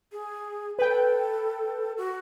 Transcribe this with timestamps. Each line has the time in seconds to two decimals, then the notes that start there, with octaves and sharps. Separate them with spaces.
0.12 G#4
0.79 A4 B4 G5
1.97 F#4